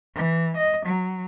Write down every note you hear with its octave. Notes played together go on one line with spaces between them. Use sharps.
E3
D#5
F#3